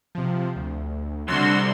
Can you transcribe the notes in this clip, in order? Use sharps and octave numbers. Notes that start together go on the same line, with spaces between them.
C3 F3
D2
C2 F#2 D3 F#4 C6 E6